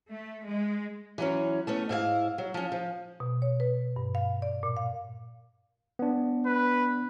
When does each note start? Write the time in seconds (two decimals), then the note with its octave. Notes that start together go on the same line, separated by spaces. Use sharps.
0.10 A3
0.45 G#3
1.18 E3 F#3 C#4
1.67 A3 B3 C#4
1.89 G#2 E4 G#4 F5
2.38 F#3
2.54 F3 C#4
2.72 F3
3.20 B2
3.42 C#5
3.60 B4
3.96 G2
4.15 F5
4.42 D5
4.63 A#2
4.77 F5
5.99 B3 D4
6.46 B4